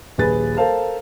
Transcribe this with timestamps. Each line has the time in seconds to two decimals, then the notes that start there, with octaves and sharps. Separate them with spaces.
0.18 D#1 A#1 G#4 B4 A6
0.57 A4 A#4 C5 F5 A5